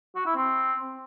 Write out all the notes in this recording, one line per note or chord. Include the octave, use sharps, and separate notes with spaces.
F#4
E4
C4